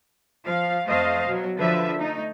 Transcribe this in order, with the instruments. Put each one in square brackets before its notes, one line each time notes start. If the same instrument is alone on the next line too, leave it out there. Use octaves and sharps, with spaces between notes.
[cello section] F3 F5
F2 A3 C5 D#5 F5
B2 F#3
D3 F3 B4 E5
A3 D#4